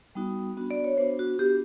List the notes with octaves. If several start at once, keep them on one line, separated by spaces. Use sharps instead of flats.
G3 B3 D#4 F#4
B3 D4 F#4
D5
C#5
B3 D4 F#4 C5
F#4
B3 D4 F#4 G4